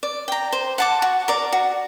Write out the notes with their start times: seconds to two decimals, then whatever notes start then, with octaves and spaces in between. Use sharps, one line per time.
0.03 D5
0.28 G5 A#5
0.52 C5
0.78 F#5 A5 D6
1.02 F#4
1.28 A#4 D5
1.52 F#4